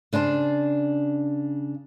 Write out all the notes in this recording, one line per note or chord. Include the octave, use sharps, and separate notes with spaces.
C#3 D4 C5 A5